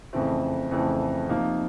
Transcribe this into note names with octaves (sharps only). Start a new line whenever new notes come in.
F2 C#3 E3 A3 C4
F2 C#3 E3 A3 C4
C3 F3 A#3 D#4